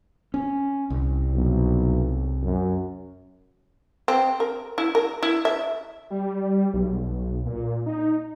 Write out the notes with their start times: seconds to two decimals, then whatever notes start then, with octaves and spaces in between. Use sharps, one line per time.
0.34 C#4
0.90 C2
1.34 B1
2.42 F#2
4.08 C4
4.40 A#4
4.78 E4
4.95 A#4
5.23 E4
5.45 E5
6.10 G3
6.74 B1
7.01 B1
7.46 A#2
7.86 D#4